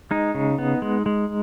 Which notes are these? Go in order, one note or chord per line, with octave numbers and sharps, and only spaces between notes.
G#3 D#4
C#3
B3
G#3
G#3